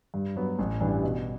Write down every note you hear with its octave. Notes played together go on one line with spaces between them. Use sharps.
G2
F#3 B3
A1
G2 E3 G3 D4
B2